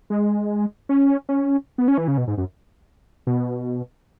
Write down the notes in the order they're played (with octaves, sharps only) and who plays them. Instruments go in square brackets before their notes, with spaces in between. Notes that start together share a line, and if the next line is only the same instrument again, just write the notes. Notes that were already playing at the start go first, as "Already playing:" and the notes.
[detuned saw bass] G#3
C#4
C#4
B3
C#4
E3
C#3
B2
G#2
F#2
B2